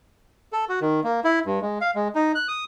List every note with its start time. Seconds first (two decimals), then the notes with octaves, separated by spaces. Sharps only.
0.53 A4
0.69 F#4
0.81 D#3
1.04 A#3
1.24 E4
1.46 G2
1.62 G#3
1.81 F5
1.95 G#3
2.15 D#4
2.35 F#6
2.48 D#6